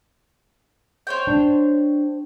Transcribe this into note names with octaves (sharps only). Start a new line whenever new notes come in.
C5 C#5 G5
D4